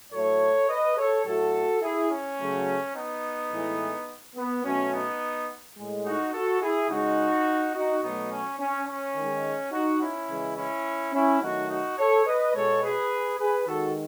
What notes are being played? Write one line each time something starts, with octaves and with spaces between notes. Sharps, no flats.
A2 F#3 A3 A4 C#5
B4 D#5
A4 C#5
A2 F#3 A3 F#4 A4
E4 G#4
C#4
C#3 F#3 A3
B3 D#4
A2 E3 G#3
B3
B2 F#3 A3 C#4
B3 D#4
A2 G#3
D#4 F#4
F#4 A4
E4 G#4
C#3 G#3 D#4 F#4
D#4 F#4
B2 F#3 A3 B3 D#4
C#4
C#4
C#4
D#3 G#3
D#4 F#4
C#4 E4
C#3 E3 G#3
C#4 E4
C#4 E4
D#3 F#3 A3 D#4 F#4
D#4 F#4
A4 C#5
B4 D#5
B2 G#3 A4 C#5
G#4 B4
G#4 B4
D#3 G#3 F#4 A4